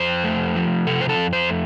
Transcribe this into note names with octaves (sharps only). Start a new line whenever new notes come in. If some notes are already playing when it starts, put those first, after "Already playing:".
Already playing: F2 C5
A3
F3
C3 A4
C5
A4
F2
C5
A3